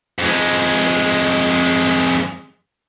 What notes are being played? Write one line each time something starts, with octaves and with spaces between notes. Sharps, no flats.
F2 G#3